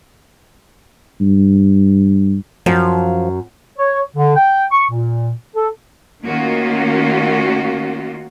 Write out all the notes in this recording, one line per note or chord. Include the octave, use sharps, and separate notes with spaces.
G2
F#2 F3
C#5
D3
G5
C#6
A#2
A4
D#3 A3 A#3 C#4 F4 F#4